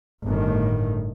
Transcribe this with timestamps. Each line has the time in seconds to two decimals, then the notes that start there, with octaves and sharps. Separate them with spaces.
0.24 G1 A2 D#3